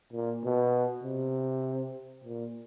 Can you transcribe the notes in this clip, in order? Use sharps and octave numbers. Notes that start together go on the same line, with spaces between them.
A#2
B2
C3
A#2